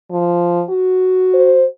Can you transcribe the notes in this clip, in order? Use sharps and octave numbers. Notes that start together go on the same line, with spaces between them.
F3
F#4
C5